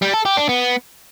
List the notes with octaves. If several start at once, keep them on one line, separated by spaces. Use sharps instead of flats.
G3
A4
G4
D4
B3